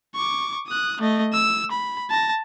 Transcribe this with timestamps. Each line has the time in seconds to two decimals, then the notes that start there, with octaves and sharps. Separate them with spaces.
0.15 C#6 D6
0.67 D#6 F#6
1.01 A3 D#5
1.33 E6
1.71 B5
2.10 A5 A#6